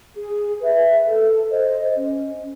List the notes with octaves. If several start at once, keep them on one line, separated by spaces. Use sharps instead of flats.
G#4
B4 E5
A4
C5 D#5
C#4